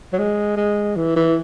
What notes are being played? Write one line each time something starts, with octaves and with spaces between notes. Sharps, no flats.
F#3
G#3
G#3
E3
E3